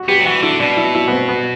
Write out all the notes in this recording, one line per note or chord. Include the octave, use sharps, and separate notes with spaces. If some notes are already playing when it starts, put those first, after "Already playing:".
Already playing: F#4
B3 G4
F#3
E3 F#4
D3 E4
B2 D4
E4
E4
B3
C4
B3